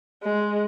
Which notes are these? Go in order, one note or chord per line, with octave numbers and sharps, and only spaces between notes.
G#3